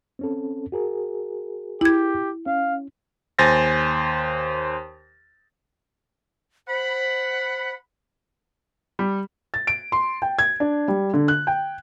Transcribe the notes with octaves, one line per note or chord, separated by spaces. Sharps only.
C4 C#4 A4
F#4 G#4 A#4
E4 G4 G#6
C#4 F5
D#2 C5 G#5 A6 A#6
C5 F#5 B5
G3
A6
D7
C6
G5
G#6
D4
G3
D3
F#6
G5